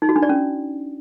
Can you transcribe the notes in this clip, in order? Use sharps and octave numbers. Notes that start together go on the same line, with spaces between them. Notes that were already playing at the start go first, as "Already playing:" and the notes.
D#4
F#4
D4
D5
C#4